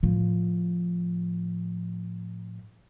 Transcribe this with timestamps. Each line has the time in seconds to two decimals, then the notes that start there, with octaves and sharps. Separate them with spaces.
0.03 A2 F3